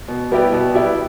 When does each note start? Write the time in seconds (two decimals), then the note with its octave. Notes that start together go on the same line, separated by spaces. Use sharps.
0.08 B2
0.31 G3 B3 E4 G4
0.52 B2
0.75 G3 B3 E4 G4